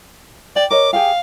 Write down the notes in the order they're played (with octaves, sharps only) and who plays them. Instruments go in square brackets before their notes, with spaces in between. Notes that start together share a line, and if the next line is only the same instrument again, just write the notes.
[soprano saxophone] D5 [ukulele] G5
[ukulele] A#4 C#5 D#5 [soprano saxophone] D6
[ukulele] G4 G#4 G5 [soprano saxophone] F5